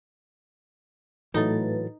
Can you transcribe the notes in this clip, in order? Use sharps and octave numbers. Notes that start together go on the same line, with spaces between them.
A2 E3 F#3 A3 D#4 A4 B4 A6